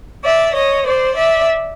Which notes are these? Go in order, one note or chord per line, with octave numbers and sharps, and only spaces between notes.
D5 E5
C#5 D#5
C5 D5
D5 E5